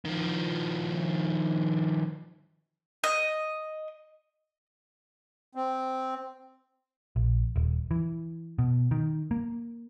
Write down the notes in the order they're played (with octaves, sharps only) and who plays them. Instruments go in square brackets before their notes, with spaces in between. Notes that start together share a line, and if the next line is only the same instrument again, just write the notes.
[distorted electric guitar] D#3 F3
[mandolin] D#5
[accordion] C4
[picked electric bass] A#1
D#1
E3
B2
D#3
A#3